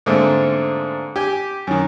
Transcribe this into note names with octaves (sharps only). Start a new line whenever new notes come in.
G#2 D3 A3 A#3 C4
G4 G#5
F#2 D#3